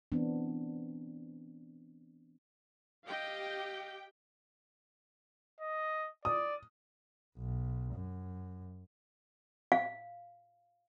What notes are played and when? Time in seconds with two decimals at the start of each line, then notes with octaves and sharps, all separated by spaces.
0.12 E3 B3 C4 D4
3.06 G4 D#5 F5 G5
5.60 D#5
6.25 D5 D#6
7.37 B1
7.94 F#2
9.72 F5